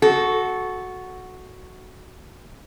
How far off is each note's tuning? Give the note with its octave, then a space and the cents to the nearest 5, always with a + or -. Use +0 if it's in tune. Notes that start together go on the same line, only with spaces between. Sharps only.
F#4 +0 A4 -20